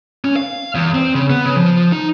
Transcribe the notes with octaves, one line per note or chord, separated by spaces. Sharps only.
C#4
F5
E2
C4
C#3
B3
C#3
F3
D#4